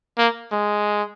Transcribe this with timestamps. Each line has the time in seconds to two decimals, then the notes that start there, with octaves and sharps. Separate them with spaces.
0.18 A#3
0.52 G#3